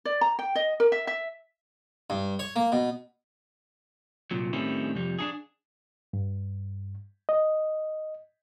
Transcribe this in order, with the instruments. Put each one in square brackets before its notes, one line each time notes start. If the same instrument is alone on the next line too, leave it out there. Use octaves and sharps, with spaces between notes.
[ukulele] D5
A#5
G5
D#5
A#4
E5
E5
[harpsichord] G2
C#5
A#3
B2
[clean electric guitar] C2 A#2 F#3
A2 D#3 G3 C4 C#4 E4
C2 F2 G3
D4 D#4 G#4
[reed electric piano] G2
D#5